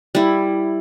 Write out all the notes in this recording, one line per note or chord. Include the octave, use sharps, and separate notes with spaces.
G3 E4